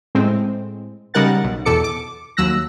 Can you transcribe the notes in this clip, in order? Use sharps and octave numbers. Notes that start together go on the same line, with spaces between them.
A2 G#3 C4
C#3 G3 D#4 A#4 F#5 A6
B1
E2 B2 A4 D6 C#7
D6
D#2 F#3 E6 F#6 A#6